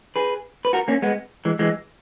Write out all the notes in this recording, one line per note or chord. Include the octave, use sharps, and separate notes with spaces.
G#4 B4
B4
F#4 A#4
A#3 C#4
G#3 B3
E3 G#3
E3 G#3